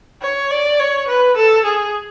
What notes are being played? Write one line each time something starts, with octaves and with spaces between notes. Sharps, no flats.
C#5
D5
C#5
B4
A4
G#4